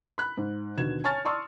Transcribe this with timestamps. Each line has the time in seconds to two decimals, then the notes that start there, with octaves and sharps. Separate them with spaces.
0.18 B5 F#6
0.37 G#2
0.77 D#2 B2 D3 G#6 E7
1.04 C#5 G#5 A5 C#6 F6 A6
1.25 D5 A5 C6 C#6 D#6 E6